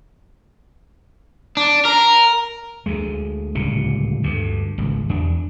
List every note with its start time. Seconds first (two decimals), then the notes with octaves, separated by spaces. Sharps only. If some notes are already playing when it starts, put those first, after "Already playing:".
1.57 D4
1.85 A#4
2.86 D2 G#3
3.55 D1 C#2 A#2 G3
4.23 D2 G2
4.78 G#1 C#2
5.09 E2 D4